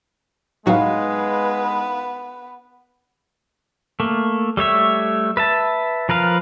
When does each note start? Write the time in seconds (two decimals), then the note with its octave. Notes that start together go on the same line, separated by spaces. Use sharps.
0.66 A2 F#3 G#3 B3 D#4 F#4 B4 F5
4.00 A3 A#3
4.57 G3 A3 C#5 E5
5.37 B4 E5 A5
6.09 F3 A#4 B4 F5